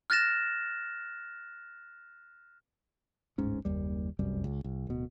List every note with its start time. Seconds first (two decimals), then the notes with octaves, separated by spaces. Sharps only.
0.10 F6 F#6 A6 A#6 E7
3.38 D1 G1 G#2 C#4
3.65 F#1 D#2 G3
4.19 F1 C2 F#2 G3
4.44 C#2
4.64 C2
4.87 D1 B2